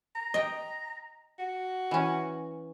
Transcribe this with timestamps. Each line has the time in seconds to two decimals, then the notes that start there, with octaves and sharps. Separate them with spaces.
0.15 A#5
0.34 D#5 G5
1.39 F#4
1.91 E3 C#4